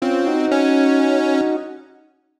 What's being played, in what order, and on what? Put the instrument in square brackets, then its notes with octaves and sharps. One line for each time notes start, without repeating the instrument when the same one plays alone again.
[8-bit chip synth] C4 [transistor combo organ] C#4 F4
[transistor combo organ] D#4 F#4
[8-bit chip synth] C#4